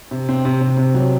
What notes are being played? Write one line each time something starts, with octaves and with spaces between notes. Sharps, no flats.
C3
C4
C3
C3
C3
F#3